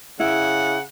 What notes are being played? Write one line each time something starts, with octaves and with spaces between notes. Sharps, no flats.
C#3 E4 F#5